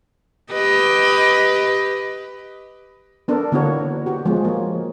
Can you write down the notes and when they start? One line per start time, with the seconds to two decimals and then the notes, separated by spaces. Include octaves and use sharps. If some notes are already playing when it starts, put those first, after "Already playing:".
0.53 G4 B4 D#5
3.28 B3 D4 A4 A#4
3.52 D3 A#3 B3 E4 F#4 C#5
4.06 F#4 G4
4.25 F3 G#3 B3
4.45 A#3 C#5